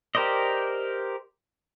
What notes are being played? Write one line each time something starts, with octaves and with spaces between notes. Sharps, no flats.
G4 A#4 C5 D5 D#5